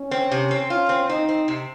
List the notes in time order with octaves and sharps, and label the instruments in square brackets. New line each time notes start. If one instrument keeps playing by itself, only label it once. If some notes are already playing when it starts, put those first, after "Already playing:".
Already playing: [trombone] C#4
[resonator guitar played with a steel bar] C4
C3
C4
[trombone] C#4 [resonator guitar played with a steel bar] F4
[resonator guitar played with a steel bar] C4
[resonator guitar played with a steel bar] C4 [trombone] D#4
[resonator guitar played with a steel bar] C4
C3